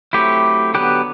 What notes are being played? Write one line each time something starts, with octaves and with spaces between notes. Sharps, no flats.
F#3 A3 C4 E4 G4
D3 F#3 B3 G4 B4